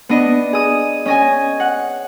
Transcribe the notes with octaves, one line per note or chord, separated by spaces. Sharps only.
B3 D4 D#5
G#4 D#6
C#4 D#5 G#5
F#5